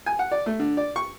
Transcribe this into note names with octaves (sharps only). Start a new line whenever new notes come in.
G#5
F#5
D5
A3
D3
D5
C#6